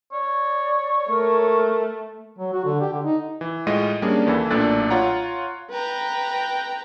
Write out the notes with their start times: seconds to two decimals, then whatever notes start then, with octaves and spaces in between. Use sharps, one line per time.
0.12 C#5 D5
1.09 A3 A#4
2.38 F#3
2.53 F#4
2.65 D3
2.81 G4
2.92 D3
3.04 D#4
3.41 E3
3.67 A2 G#3 F4 D#5 D#7
4.02 G3 A#3 C#4 D4 G#4
4.27 D#2 E3 E4 A4
4.51 B1 A#2 A3 D4 F#6 A6
4.90 F4 C#5 F#5 A#5
5.69 B4 G5 A#5